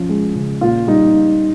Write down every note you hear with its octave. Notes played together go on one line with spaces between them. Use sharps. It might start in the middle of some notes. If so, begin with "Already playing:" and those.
Already playing: F3 C#4
G#3
C#3
A#2 F4
G3 D#4